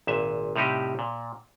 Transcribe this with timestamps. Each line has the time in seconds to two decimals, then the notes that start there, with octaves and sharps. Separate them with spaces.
0.07 G#1 A#2 E5
0.56 A2 C3 G3 D#4 G4
0.99 A#2